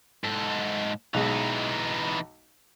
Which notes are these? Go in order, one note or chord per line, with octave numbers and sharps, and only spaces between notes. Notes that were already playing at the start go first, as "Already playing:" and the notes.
G#2 A4
B1 E3 G#3 D#4